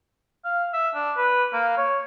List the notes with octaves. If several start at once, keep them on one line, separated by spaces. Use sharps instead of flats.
F5
E5
D4
B4
A#3
C#5